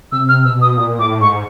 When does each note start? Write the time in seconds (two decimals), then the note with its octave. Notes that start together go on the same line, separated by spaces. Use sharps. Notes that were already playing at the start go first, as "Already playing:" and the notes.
0.12 C3 E6
0.29 F6
0.44 B2 E6
0.61 D#6
0.77 A#2 D#6
0.99 A2 D6
1.21 G#2 C#6